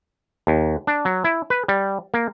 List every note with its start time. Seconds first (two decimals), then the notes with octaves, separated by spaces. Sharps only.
0.47 D#2
0.87 D4
1.05 F#3
1.24 E4
1.50 B4
1.68 G3
2.14 A#3